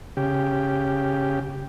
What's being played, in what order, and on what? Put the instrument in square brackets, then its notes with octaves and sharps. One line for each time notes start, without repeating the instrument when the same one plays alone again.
[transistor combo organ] C#3 G4